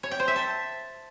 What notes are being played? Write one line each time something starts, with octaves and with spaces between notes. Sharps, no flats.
C#5
G5
C5
E5
A5